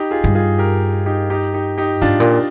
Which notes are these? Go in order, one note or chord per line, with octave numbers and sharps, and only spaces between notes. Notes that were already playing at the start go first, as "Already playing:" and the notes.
Already playing: D#4 G4
F4 G#4
G2
F4 G#4
G4 A#4
D#4 G4
D#4 G4
D#4 G4
D#4 G4
G#2 D4 F4
A#2